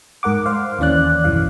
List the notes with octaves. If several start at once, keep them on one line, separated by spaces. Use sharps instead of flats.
G#2 A#4 F#5 D6
C5 F5
D#2 E3 C#4 D5 F#6
B1 F#2 E3 F5